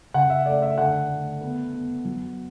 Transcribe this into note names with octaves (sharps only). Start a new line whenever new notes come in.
C#3 F#5
E5
A3 D5
E5
D3 F#5
A3
B3
B3
F#3